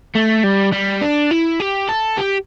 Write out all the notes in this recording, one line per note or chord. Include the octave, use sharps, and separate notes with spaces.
A3
G3
G3
D4
E4
G4
A4
G4